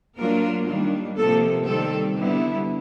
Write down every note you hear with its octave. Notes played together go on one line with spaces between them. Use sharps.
F#3 A#3 D4 F4 A#4
D#3 G3 A#3 D4
C3 F3 A#3 A4
D#3 G3 C4 A4
D3 G3 B3 E4